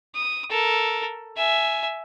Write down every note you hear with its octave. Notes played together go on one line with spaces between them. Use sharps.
D#6
A4 A#4
E5 G#5